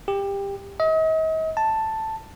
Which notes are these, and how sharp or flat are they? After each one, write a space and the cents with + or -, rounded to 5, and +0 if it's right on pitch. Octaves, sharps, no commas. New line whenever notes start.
G4 +20
D#5 +40
A5 +5